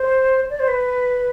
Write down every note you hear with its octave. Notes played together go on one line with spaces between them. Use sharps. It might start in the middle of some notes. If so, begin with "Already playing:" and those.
Already playing: C5
D5
C5
B4